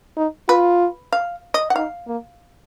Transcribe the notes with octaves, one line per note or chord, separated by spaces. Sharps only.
D#4
F4 B4
F5
D#5
F#5
D#4 F5
A#3